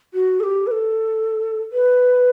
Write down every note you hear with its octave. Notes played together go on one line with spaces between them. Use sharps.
F#4
A4
G4
B4
A4
B4